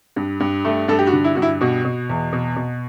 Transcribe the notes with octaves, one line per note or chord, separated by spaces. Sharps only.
G2
G2
A3
G2 A4
G4
F#4
D3
E4
G2 F#4
E4
B2 F#4
B2
E2
B2
B2